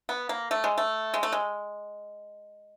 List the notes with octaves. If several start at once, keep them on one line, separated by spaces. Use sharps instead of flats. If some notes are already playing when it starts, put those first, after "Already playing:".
B3
A#3
A3
G#3
A3
G#3
A3
G#3